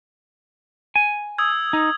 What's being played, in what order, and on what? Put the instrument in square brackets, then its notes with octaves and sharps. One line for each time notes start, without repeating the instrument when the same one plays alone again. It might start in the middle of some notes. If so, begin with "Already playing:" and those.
[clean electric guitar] G#5
[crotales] D#6 E6 G#6
[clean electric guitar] D#4